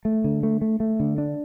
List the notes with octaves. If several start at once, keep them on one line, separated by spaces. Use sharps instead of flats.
A3
D3
A3
A3
A3
D3
D4